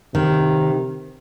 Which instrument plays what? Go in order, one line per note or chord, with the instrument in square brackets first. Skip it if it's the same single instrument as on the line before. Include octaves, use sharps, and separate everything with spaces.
[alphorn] C3 [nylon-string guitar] D#3